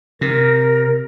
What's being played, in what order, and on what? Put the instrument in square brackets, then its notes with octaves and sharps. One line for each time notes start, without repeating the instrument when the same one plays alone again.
[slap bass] C3 [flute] A#4